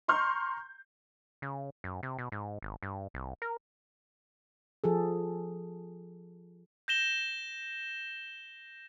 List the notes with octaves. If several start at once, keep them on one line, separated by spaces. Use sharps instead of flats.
A#5 C6 C#6 F6 G6
C#3
F#2
C3
B2
G#2
G#1
G2
C2
A#4
F3 G#4 A4
G6 A#6 E7 G7